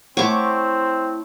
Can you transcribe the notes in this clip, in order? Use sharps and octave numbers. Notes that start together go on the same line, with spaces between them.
A3 C4 E4 C#5 F#5 D6